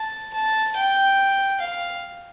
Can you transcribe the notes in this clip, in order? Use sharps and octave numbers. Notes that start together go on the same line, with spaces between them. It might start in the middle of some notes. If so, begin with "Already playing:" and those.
Already playing: A5
A5
G5
F5